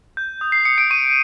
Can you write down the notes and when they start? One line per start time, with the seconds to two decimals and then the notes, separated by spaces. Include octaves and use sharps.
0.17 G6
0.41 D#6
0.52 C7
0.65 D#6 C#7
0.78 D7
0.90 C#6 D#7